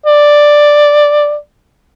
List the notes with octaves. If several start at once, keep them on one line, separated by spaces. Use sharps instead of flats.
D5